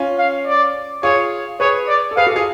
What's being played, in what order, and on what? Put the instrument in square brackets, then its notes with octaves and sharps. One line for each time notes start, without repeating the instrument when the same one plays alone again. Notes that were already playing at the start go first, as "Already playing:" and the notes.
Already playing: [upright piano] C#4 F4
[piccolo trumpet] F5
D5
[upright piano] F4 G#4 [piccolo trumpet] C#5
[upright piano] G#4 B4 [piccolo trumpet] C#5
[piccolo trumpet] D5
[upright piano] A4
[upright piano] G#4 B4 [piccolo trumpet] F5
[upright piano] F#4 A4
F4 G#4